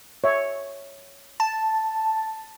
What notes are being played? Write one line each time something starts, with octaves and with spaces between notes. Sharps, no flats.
C#5 E5
A5